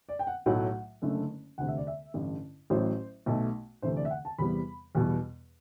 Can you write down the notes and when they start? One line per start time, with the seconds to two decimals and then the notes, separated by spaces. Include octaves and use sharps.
0.09 D5
0.19 G5
0.27 F#5
0.46 B1 A2 F#3 A3 F#5
1.02 F#1 F#2 D3 A3
1.58 E1 D2 C3 F#5
1.68 E5
1.77 D5
1.87 E5
2.14 A1 G2 D3
2.70 A1 A2 F#3 C5
3.26 B1 B2 A3
3.82 D2 C3 E3 A3 C5
3.97 D5
4.05 E5
4.10 F#5
4.25 A5
4.38 E2 C3 G3 B3 B5
4.95 E2 B2 G3